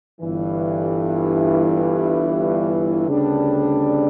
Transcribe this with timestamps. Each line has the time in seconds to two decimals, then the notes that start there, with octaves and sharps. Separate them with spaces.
0.20 G1 G2 E3
3.08 D2 C#3 G3 B3 D4